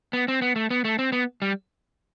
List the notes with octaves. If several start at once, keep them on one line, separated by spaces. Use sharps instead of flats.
B3
C4
B3
A3
B3
A3
C4
B3
G3